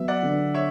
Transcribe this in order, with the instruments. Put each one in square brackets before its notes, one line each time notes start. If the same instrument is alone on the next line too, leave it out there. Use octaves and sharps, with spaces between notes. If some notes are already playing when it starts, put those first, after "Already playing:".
Already playing: [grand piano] F#3 B3 [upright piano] E5
[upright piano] D5 F#5
[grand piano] D3
[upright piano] C#5 E5